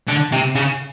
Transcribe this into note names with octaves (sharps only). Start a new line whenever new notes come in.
D3
C3
C#3